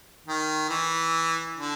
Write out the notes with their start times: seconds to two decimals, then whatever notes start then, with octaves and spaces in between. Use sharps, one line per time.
0.27 D#3
0.69 E3
1.57 D3